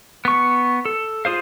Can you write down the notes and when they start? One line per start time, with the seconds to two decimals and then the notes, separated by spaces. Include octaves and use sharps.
0.25 B3 C#6
0.85 A4
1.25 F4 G#4 C5 F5